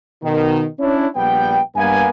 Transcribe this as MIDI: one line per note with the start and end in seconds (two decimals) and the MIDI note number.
0.22 0.66 47
0.22 0.66 51
0.79 1.07 61
0.79 1.07 62
0.79 1.07 64
0.79 1.07 73
1.16 1.60 34
1.16 1.60 55
1.16 1.60 59
1.16 1.60 79
1.76 2.09 43
1.76 2.09 58
1.76 2.09 59
1.76 2.09 77
1.76 2.09 80